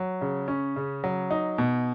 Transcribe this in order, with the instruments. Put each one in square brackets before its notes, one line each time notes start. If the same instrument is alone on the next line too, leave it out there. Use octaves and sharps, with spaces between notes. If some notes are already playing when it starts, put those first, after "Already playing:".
Already playing: [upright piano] F#3
C#3
C#4
C#3
F#3
D#4
B2